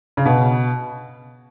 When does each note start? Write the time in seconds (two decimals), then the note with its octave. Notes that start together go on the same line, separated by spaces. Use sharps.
0.17 C#3
0.25 B2